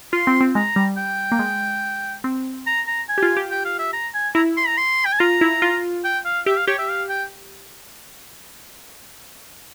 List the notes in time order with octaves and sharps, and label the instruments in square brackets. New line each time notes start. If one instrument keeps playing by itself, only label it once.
[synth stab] F4 [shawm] C6
[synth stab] C4
C4
[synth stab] G#3 [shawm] A#5
[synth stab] G3
[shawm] G5
[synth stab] A#3
G#3
C4
[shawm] A#5
A#5
G#5
[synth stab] G4
F4
G4
[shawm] G5
F5
E5
A#5
G#5
[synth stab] E4 [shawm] A#5
[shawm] C6
A#5
C6
G5
G#5
[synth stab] F4 [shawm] A#5
[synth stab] E4
F4
[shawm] G5
F5
[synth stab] G4 [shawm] E5
[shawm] F5
[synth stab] G4 [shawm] C#5
[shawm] E5
F5
G5